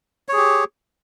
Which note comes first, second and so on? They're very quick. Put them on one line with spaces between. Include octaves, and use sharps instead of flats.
C#5 G#4 G4